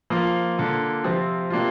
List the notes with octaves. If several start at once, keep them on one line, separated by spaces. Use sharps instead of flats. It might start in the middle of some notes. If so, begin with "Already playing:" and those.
F3 A#3 F4
D3 A#3 F4
C3 F3 C4 F4
C3 A#3 D4 F4